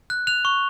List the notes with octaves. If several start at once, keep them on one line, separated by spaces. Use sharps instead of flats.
F#6
F#6 F7
C#6